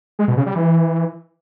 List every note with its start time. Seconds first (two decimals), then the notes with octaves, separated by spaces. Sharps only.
0.19 G#3
0.28 B2
0.37 C#3
0.46 G3
0.55 E3